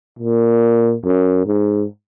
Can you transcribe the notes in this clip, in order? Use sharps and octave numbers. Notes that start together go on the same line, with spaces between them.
A#2
F#2
G#2